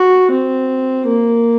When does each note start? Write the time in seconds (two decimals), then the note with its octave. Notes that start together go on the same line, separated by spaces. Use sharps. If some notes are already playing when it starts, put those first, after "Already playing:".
Already playing: F#4
0.32 C4
1.08 A#3